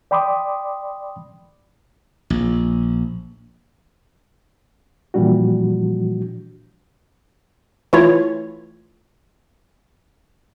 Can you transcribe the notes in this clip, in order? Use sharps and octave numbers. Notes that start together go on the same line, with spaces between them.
D5 G5 B5 C6 D6 D#6
A#1
A#2 E3 F3 G3 D4 F#4
E3 A3 E4 F4 C#5